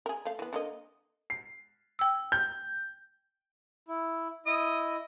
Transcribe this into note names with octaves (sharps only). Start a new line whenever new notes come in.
G#4 A#4
A3 F5
E3 B3
D3 A#3 D#5
C7
G5 E6
G6
E4
E4 D#5 D#6